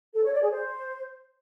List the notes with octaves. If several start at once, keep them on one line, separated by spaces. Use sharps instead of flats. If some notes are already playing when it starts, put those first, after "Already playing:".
A4
C#5
D5
G#4
C5